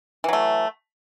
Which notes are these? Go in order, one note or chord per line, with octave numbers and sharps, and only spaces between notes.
E3 F#3 A3